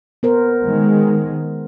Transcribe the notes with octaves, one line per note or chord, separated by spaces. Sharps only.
B3 A#4 C5
D#3 G#3